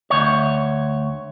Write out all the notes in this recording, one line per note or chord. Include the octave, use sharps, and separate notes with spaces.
D2 C#5